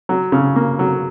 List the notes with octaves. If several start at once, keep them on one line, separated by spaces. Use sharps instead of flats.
F#3
C#3
A#3
F#3